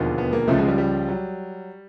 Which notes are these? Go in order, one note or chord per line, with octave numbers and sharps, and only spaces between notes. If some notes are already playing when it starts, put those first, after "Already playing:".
Already playing: E1 D#2 D3 F3
B3
A#3
C#2 C#3 F3 A3
G#3
G3
G3
F#3